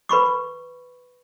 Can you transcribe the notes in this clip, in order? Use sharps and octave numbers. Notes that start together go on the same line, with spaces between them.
B4 B5 C#6 D6